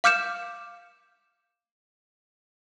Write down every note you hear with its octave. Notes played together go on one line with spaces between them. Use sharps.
F5 D6 F6 G6 C#7 E7